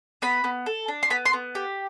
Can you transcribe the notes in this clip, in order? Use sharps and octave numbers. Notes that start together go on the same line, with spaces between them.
B3 B5
B3
A4
D4
C6
B3 B5
C6
B3
G4